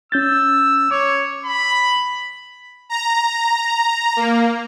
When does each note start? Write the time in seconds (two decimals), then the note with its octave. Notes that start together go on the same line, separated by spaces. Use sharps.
0.12 C#4 E6 G6 A6
0.91 C#5 D6
1.46 B5
2.89 A#5
4.16 A#3